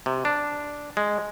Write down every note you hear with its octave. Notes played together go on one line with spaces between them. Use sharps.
C3
D4
G#3